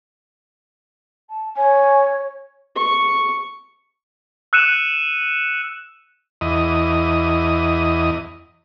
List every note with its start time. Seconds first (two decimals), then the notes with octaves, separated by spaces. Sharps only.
1.30 A5
1.57 C#5 G#5
2.76 C#6
4.53 E6 F#6 C#7 D#7 E7
6.41 E2 D#5